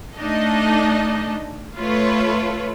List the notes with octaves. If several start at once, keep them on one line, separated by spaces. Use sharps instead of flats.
A3 D4 D#4 A4 D#5
A3 F4 A4 B4 C#5